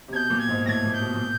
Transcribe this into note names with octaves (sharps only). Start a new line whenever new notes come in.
C3
B2 G6 G#6
A#2
G#6
G#2
A2 G#6 A#6
A#2
G6
B2
A#2